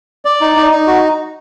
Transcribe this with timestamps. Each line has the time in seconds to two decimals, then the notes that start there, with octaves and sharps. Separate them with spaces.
0.25 D5
0.41 D#4
0.56 D#4
0.71 D#4
0.87 F#4